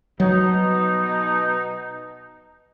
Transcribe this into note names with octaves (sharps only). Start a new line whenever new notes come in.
B2 F#3 D#4